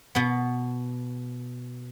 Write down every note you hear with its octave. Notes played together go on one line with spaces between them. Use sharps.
B2 B3